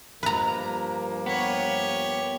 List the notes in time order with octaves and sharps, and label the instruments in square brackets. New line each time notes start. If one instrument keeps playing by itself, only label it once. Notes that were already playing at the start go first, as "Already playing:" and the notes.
[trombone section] G2 F3 A#3 [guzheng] B4 A#5
[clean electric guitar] B3 [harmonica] G4 C#5